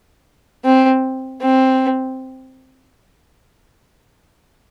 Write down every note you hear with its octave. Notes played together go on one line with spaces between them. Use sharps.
C4
C4